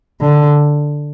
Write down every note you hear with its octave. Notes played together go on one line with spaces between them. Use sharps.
D3